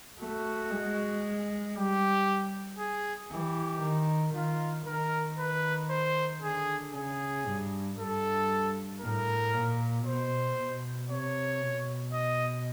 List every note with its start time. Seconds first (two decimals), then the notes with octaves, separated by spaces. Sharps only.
0.19 A3 F#4
0.71 G#3
1.75 G3 G4
2.79 G#4
3.31 E3 G4
3.82 D#3
4.34 D#3 F4
4.86 D#3 A#4
5.39 B4
5.90 C5
6.42 D3 G#4
6.94 C#3 G#4
7.46 G2
7.98 G2 A4
9.01 A2 A#4
9.53 A#2
10.05 B2 C5
10.57 B2
11.09 C3 C#5
11.61 B2
12.13 D#5